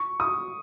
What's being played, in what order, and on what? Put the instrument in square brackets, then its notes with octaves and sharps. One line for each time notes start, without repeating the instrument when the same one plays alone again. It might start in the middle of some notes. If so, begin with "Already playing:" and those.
Already playing: [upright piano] C#6
D#6